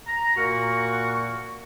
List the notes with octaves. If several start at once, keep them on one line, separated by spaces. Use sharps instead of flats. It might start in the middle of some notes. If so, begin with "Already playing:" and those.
A#5
A#2 A#3 F#4 A#4 F#5 C#6